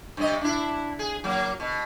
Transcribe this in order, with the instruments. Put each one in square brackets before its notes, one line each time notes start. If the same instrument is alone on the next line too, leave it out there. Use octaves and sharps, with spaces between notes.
[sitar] G2 C3 D#5
D4 E4
G#4
F#3 A#3
B2